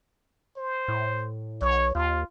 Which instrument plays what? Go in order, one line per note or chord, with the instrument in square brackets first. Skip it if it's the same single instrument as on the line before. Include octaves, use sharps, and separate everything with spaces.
[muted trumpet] C5
[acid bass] A2
[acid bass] B1 [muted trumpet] C#5
[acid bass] D#2 [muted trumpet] F4